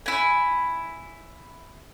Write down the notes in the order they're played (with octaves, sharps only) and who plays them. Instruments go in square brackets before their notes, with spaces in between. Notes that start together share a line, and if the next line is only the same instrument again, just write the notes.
[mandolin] E4 G#5